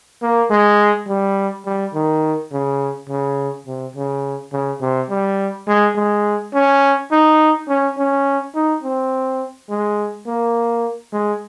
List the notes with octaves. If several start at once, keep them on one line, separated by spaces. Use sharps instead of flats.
A#3
G#3
G3
G3
D#3
C#3
C#3
C3
C#3
C#3
C3
G3
G#3
G#3
C#4
D#4
C#4
C#4
D#4
C4
G#3
A#3
G#3